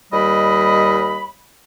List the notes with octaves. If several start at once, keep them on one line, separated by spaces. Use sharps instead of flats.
D#2 G3 D#5 B5